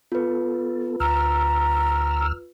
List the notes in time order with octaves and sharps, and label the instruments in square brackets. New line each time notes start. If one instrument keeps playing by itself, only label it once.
[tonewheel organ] B3 A4 [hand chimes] F4 B4
[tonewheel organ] D2 E6 F6 [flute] A#5